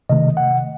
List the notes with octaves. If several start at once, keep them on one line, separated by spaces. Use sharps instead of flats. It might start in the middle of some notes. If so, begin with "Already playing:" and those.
C3 D#3 A3 D#5
F#5